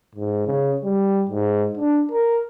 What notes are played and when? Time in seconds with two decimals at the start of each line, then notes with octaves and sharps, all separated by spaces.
0.15 G#2
0.47 C#3
0.84 G3
1.30 G#2
1.77 D4
2.12 A#4